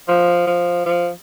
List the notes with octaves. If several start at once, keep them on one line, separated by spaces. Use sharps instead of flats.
F3
F3
F3